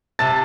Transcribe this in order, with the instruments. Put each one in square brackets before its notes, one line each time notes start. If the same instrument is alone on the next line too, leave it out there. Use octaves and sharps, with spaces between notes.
[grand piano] C3 A5 A6